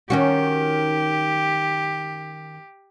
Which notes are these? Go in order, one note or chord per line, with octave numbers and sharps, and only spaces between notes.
D#3 C#4 F#4 G4